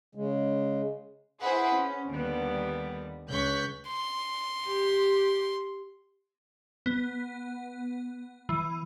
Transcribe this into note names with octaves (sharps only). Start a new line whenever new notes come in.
C#3 G#3
E4 G#4 B4 C5 F#5
C#4
D#2 D3 G3 B3
C#2 C#5 C#6 F#6 G6 B6
C6
G4
B3
E3